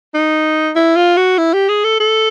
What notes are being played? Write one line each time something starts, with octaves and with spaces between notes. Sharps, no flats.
D#4
E4
F4
F#4
E4
G4
G#4
A4
A4